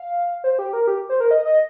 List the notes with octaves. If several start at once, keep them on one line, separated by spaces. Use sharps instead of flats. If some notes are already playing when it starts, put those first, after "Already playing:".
Already playing: F5
C5
G4
A#4
G4
C5
A#4
D#5
D#5